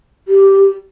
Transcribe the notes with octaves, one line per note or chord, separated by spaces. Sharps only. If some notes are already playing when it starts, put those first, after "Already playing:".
G4